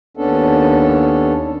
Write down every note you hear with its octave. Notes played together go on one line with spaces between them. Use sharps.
D#2 B3 C#4 D4 A4